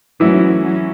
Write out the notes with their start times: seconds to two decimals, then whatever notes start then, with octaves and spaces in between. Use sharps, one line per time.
0.20 G#2 E3 F#3 A3 C#4 E4 F#4
0.62 F#3 C#4 F#4